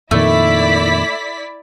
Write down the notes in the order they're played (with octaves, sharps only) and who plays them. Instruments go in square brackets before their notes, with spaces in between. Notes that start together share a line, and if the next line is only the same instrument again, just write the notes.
[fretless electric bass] F2 A#2 D#3 [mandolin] A3 [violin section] E4 D5 B6